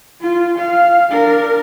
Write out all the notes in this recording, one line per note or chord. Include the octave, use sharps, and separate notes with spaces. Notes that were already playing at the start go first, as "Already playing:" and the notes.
F4
F5
D4 A#4